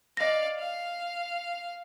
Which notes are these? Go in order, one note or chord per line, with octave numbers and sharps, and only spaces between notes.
D5 D#5 F5 A#6
F5